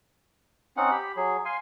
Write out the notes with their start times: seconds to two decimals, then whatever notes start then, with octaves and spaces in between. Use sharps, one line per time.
0.77 C4 C#4 D#4 F#5
0.91 G4 B5
1.16 F#3 G#4
1.45 F5 G#5 C6